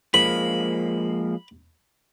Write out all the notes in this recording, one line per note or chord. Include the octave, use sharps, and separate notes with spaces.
F3 G#3 A#3 B5